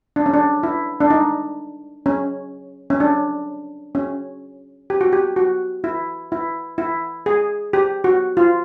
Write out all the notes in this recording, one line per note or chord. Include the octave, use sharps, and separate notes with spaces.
D4
C#4
D4
E4
D4
D#4
C#4
C#4
D4
C#4
G4
F#4
G4
F#4
E4
E4
E4
G#4
G4
F#4
F4